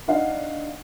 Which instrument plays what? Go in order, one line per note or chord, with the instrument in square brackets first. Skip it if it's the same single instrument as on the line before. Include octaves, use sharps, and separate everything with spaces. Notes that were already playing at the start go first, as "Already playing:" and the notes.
[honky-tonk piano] D4 D#4 F5 F#5